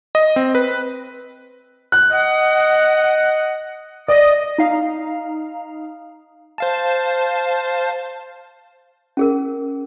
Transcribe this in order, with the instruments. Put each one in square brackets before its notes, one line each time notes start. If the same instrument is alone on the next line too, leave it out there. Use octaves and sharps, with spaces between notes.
[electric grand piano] D#5
C4
B4
[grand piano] F#6
[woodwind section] D#5 F#5
[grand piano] D5 [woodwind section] D#5
[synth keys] D#4 F5
[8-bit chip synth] C5 F5 A5
[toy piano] C#4 G#4 A#4